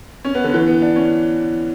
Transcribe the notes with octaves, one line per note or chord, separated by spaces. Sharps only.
C#4
B3
D3
E3
B3
D4
C#4